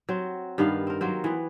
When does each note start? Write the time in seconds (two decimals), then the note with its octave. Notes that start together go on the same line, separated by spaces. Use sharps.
0.09 F#3 C4
0.58 G2 D#3 B3 F5
0.87 C4 A#4
1.01 F#3 A#3 C4
1.24 E3 B3